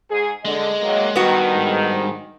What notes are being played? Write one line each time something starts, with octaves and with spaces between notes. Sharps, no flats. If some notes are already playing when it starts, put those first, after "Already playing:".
G#2 G#4
D3 G#3 D#5
D#3 F#3 A#3
G2 D#3 B3 F#4
G#2